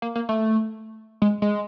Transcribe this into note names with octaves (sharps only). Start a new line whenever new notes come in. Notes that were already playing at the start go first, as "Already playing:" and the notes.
A#3
A#3
A3
G#3
G#3